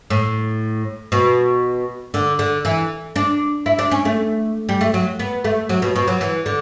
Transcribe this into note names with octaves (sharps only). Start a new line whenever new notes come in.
A2
B2
D3
D3
E3
D4
E4
D4
C#4
A3
G3
A3
F#3
B3
A3
F#3
B2
B2
F#3
E3
D3